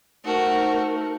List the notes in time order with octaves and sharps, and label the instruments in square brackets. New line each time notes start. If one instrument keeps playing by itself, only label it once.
[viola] A3 A#4 [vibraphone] D#4 C5 A5 [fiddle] F#4